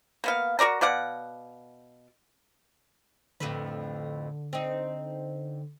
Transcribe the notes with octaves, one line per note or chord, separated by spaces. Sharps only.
A#3 B3 F5
F#4 A#4 D5 A#5
B2 D5 F5 F#5
F2 A2 D3 B4
C4 D#4